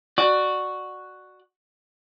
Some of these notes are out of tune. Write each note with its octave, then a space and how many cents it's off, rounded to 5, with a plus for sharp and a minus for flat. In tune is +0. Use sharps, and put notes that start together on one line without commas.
F#4 +0 D5 +20